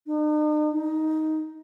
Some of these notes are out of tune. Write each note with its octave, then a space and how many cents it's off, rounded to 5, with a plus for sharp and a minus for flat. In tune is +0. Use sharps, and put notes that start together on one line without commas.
D#4 -45
D#4 +10